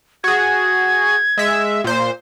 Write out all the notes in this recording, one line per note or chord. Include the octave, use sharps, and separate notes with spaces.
F#4 G#4 G#6
G#3 E5
A#2 C5